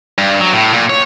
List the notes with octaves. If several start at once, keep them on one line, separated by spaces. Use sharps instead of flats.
G2
F#3
A2
A#2
C#5